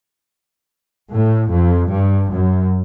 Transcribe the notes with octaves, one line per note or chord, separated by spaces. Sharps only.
A2
F2
G2
F#2